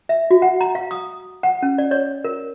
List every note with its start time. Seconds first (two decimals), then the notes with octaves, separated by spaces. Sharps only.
0.09 E5
0.31 F#4
0.42 F#5
0.61 A#5
0.75 F5
0.91 D#6
1.43 F#5
1.63 C#4
1.78 D5
1.91 C#5
2.24 A#4